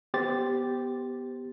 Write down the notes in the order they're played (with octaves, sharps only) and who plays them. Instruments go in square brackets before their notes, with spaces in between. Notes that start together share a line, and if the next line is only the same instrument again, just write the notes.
[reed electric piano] B3 G4 C5 A6